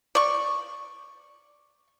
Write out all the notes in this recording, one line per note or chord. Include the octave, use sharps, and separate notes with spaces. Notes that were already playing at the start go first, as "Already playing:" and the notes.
D5 C#6